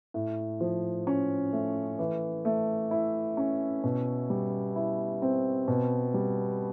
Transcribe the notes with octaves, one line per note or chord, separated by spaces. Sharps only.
A2
F3
C#4
A3
E3
A3
E4
C#4
B2
G3
E4
C4
B2
G3